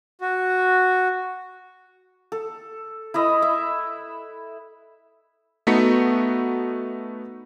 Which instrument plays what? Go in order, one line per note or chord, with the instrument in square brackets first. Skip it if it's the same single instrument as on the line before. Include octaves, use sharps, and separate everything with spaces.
[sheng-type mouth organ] F#4
[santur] A4
E4 B4 D#5
E5
[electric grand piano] A3 B3 D#4 F#4 B6 C#7